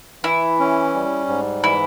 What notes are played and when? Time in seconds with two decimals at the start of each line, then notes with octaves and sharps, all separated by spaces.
0.24 E3 E4
0.59 C#4
0.94 G3
1.28 G#2
1.64 E3 E4